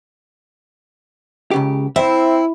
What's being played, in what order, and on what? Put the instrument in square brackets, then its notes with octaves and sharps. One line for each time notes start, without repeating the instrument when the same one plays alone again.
[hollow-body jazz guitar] C#2 C#3 G4
[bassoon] C4 [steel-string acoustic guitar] E4 [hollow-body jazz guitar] C5 E5